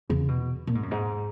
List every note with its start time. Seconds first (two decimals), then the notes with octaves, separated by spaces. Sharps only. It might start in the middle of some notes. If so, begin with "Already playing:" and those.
0.10 E2 C#3
0.28 B2
0.67 A#2
0.75 G#2
0.83 F#2
0.91 G#2